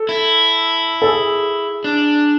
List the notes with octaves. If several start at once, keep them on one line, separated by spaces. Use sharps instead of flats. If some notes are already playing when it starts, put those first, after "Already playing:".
Already playing: A4
E4
A4
G#4
D4